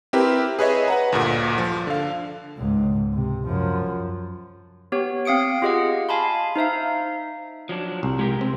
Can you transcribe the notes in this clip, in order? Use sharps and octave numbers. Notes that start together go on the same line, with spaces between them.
C4 E4 G4 A#4 B4
G#4 B4 C#5 D#5 E5
B4 F#5 A#5
D2 G2 A#2
F3
D3 F5
C#2 G#2
C3
F#2 F3
B3 G4 C#5
C4 F5 D#6 C#7 D7
F4 G4 G#4 D#5 F5 F#5
F5 G#5 A5 B5 C6
D#4 C5 E5 F5
F3 F#3 D4
C2
G#3 G4 A#4
C4